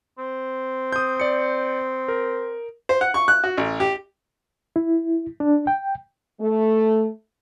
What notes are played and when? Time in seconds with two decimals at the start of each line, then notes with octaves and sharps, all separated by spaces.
0.18 C4
0.93 D#6 G6
1.20 D5 C#7
2.08 A#4
2.89 C5
3.01 F#5
3.14 C#6
3.28 F#6
3.44 F#4
3.57 A1
3.80 G4
4.76 E4
5.40 D4
5.67 G5
6.40 A3